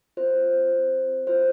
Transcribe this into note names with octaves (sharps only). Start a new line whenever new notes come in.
C4 F4 C5
C4 F4
C4 F4 C5